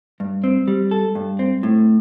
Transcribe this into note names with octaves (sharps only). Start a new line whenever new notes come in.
G2
C4
G3
A4
G2
C4
A2